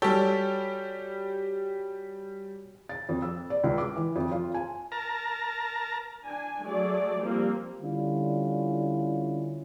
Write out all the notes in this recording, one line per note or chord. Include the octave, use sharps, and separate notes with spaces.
G3 F#4 G4 A4 C#5 G#5
A6
F2
E6
D5
C#2
D6
E3
F2
F4
G#5
A#4 A5 A#5
D4 G#5
F#3 A3 G#4 D5
F3 G3 A#3 C4
D3 G3 C#4 E4 F4